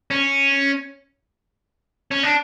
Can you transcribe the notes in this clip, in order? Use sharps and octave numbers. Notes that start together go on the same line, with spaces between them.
C#4
C#4
D4